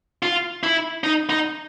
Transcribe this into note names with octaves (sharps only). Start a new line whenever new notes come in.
F4
E4
D#4
D#4